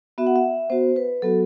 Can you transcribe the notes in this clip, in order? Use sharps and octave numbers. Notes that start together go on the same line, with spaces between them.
B3 F#4 E5
F#5
E5
B3 F#4 C5
B4
F#3 B3 F#4 A4